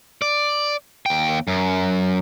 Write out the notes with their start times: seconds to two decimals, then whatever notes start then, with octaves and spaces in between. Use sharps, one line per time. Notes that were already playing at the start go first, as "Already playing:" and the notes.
0.22 D5
1.06 D#2 G5
1.48 F#2